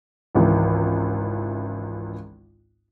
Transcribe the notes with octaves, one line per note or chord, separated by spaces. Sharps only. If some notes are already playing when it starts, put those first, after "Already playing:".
G#1 C#2 E3